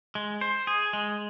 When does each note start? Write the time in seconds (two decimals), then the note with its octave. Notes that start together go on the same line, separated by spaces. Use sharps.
0.15 G#3
0.41 C5
0.67 G#4
0.93 G#3